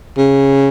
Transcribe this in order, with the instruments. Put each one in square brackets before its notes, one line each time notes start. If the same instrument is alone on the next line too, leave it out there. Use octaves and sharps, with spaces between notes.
[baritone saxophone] C#3